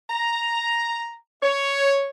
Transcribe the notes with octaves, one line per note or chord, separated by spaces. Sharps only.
A#5
C#5